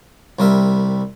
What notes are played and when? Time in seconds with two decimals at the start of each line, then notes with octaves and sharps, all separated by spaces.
0.39 C2 G3 A#4 E5